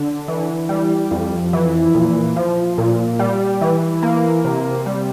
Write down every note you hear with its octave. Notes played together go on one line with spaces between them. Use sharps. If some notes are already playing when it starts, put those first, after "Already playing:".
Already playing: D3
E3
G3
F2
E3
A#2
F3
A#2
G3
E3
A#3
C3
G3